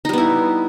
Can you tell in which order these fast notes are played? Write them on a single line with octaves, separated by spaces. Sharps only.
D#4 G3 B3 E4